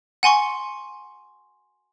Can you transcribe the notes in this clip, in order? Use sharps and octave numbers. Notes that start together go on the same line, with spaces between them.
F#5 G#5 C6 C#6